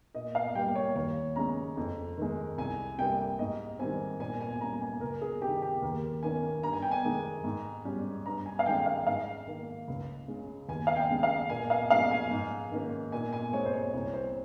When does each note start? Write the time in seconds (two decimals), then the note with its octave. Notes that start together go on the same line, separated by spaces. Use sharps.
0.15 A#2 D#5
0.35 F5
0.55 G3 A#3 G5
0.75 C#5
0.96 D#2 C#5
1.36 C#3 G#3 C#4 A#5
1.77 F2
2.18 D#3 G#3
2.58 C2 G#5
2.98 C3 G3 A#3 G5
3.39 G#2 D#5
3.79 D#3 G3 C4 G#5
4.20 A#2 G#5
4.41 G#5
4.61 G3 C#4 A#5
4.81 G#5
5.01 C#2 A#4
5.22 G#4
5.42 C3 D#3 G4
5.62 G4
5.82 D#2 A#4
6.23 D#3 A#3 C#4 G#5
6.63 G2 A#5
6.73 G#5
6.82 G5
6.91 G#5
7.04 D#3 G#3
7.44 G#2
7.85 G3 C#4
8.26 G2 A#5
8.46 G#5
8.59 F5
8.66 D#3 G#3 C#4 G5
8.86 F5
9.07 G#2 F5
9.47 D#3 A#3
9.88 C#2
10.28 C#3 G#3 C#4
10.69 D#2 G#5
10.87 F5
10.96 G5
11.10 C#3 G#3 C#4
11.23 F5
11.49 A#2 G#5
11.70 F5
11.90 F3 G#3 C#4 F5
12.11 G#5
12.31 G#2
12.71 D#3 A#3 C#4
13.12 A#2 G#5
13.33 G#5
13.53 G#3 C4 C#5
13.65 C5
13.73 C#5
13.93 C2 C#5
14.14 C5